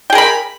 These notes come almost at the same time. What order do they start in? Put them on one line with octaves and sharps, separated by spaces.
G5 G#4 A#4 B5